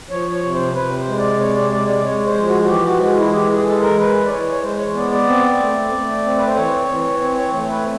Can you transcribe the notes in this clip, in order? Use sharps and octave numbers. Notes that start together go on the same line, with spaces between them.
F3 C#5
C#5
C3
C5
C3 B4
C5
G#3
D5
C3 C#5
D5
G#3 D5
D5
G#3 C#5
C5
F3
F#4
F#4
E3 G4
F#4
G#3 F#4
E4
G#4
E3 G4
G#4
G#3 A4
A#4
E3 B4
D5
E3 C#5
C#5
G#3 C5
C#5
B3 D5
D5
C4
A3
A3
C4
B4
C5
E3 C#5
E3
C4 C#5
C#5
A3 C#5
B4